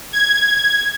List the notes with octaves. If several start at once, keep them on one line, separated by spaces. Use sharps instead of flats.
G#6